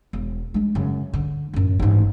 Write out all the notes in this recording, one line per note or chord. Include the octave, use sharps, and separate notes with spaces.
E1
G#3 D4
F#2 C#3
D3
A1 F#2
A1 G#2